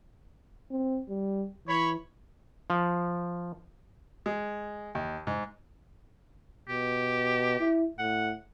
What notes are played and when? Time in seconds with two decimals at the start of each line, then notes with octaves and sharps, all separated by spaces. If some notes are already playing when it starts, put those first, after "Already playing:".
0.71 C4
1.09 G3
1.67 E3 C#5 B5
2.70 F3
4.26 G#3
4.95 D#2
5.27 G#2
6.69 B2 G4
7.60 E4
7.98 A2 F#5